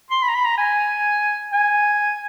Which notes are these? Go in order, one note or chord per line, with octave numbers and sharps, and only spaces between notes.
C6
B5
A#5
B5
A#5
G#5
G#5